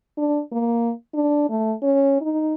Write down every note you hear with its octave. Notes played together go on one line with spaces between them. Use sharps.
D4
A#3
D4
A3
C#4
D#4